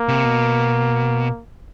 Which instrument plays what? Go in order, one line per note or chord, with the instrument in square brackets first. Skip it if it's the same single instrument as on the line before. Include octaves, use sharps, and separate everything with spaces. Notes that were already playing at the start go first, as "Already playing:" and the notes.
Already playing: [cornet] A#3
[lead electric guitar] C3
B2